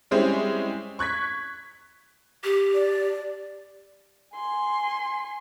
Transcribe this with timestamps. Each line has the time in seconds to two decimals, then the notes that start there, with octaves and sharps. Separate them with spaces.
0.11 G3 G#3 C4 C#4 E4
0.99 C#6 F#6 G#6 B6
2.44 G4
2.75 D5
4.36 G#5 C6